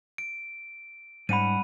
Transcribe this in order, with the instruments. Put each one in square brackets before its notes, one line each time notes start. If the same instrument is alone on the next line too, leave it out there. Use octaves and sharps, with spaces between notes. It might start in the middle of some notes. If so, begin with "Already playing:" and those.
[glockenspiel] D7
[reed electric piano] G#2 [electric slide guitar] G3 C#4 F#5 [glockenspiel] B5 D#7